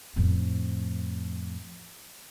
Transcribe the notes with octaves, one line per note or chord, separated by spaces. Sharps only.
F2 A2